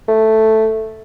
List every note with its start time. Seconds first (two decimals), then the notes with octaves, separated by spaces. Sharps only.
0.08 A3